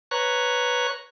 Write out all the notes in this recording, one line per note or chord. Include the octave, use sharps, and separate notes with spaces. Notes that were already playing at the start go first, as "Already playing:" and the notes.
B4 C#5 A#5 C#6 F#6